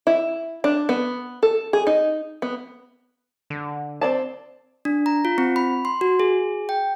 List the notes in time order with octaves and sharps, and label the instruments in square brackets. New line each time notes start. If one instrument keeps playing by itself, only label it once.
[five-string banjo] E4
D4
B3
A4
G#4
D#4
B3
[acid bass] D3
[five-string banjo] C4 D5 A5
[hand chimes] D4
A#5
F4
C4
B5
C6
F#4
G#4
G5